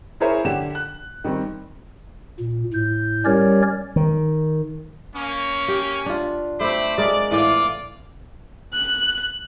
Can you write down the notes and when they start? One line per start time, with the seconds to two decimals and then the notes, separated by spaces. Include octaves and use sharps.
0.20 E4 G#4 A#4 C5 C#5 E5
0.45 D3 G4 E7
0.75 F#6
1.24 D#3 G3 C4
2.40 A#2
2.73 A2 G6
3.25 G3 C#4 G4 A#4 C#5 D5
3.96 D#3
5.15 A#3 C#4
5.68 G4
6.06 D4 F4
6.61 A3 C4 C5 B5 D6
6.98 G#3 A#4 D5
7.31 A2 E3 F4 D5 D6
8.74 F#6